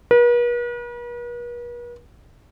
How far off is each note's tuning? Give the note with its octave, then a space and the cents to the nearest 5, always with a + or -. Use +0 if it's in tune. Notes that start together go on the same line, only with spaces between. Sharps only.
B4 -45